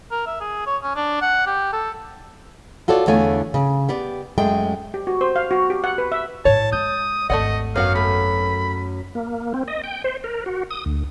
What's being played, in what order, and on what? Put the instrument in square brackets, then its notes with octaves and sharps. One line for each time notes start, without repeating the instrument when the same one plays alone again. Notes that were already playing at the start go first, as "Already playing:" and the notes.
[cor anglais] A#4
E5
G#4
C#5
C#4
D4
F#5
G4
A4
[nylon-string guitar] F4 F#4 A4 C#5 D5
E2 D3 A3 C#5 F5 G#5
C#3
B3 G4 D5
F#2 G#3 A3 G5
[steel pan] G4
F#4
C5
F5
F#4
G4
F#5
B4
E5
[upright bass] A2 E4 [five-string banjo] C#5 [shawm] A5
[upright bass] G#3 [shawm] D#6 [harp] G6
[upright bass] G#1 D#2 [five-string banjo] A3 D5 F#5 [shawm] D#5
[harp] F#2 [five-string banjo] B3 F#4 F#5 [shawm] F5
[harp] A3 [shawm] B5
[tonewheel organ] A#3
C4
D#5
G5
C5
A#4
F#4
D#6
D2